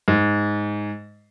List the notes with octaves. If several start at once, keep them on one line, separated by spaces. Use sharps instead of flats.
G#2